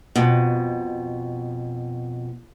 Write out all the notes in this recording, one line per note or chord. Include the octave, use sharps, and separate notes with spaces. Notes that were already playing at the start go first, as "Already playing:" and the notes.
F2 B2